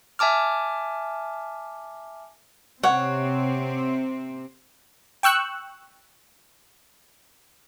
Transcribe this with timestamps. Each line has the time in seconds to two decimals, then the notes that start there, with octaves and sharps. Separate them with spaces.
0.19 E5 G#5 A5 D6 F6
2.83 C3 C4 C#5 F#5
5.23 G5 C#6 E6 F#6